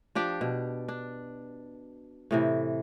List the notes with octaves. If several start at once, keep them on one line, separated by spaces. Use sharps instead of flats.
F3 D4 G4 D5
B2
D4
A2 C3 E3